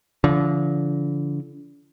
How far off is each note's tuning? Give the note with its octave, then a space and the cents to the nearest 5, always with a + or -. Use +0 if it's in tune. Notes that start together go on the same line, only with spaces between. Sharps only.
D3 -35 F3 -35